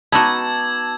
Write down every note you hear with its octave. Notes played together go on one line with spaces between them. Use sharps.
B3 D#4 F#4 A5 D6 E6 G#6